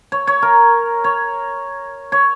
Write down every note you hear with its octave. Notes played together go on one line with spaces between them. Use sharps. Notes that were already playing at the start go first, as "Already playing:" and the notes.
C#5
C#5
A#4
C#5
C#5